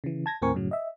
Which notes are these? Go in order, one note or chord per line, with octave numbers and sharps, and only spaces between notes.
C#3 E3
A5 G#6 A#6
D#2 A2 C4 A#4 G#5 C#6
F#2 A2 C#3 F#3
D#5 E5